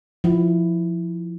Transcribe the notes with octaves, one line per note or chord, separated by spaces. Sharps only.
F3 E4